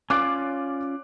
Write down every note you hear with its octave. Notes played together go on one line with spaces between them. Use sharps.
C#4 F4 D5 D6 F#6